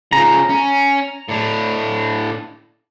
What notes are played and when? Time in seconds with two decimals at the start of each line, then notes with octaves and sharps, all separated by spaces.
0.13 C#3 F3 A#5
0.50 C#4
1.28 A2 D4